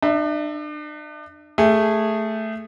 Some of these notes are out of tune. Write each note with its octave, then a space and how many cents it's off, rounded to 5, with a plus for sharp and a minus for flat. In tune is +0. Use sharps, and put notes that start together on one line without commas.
D4 +40 E5 +0
A3 +0 G#4 -15